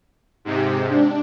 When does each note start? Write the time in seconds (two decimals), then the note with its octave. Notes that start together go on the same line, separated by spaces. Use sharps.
0.45 G#2 C3 G4
0.87 D4